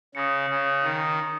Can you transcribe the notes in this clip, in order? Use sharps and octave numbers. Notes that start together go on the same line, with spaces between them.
C#3 D#6 A#6 C#7
C#3
D#3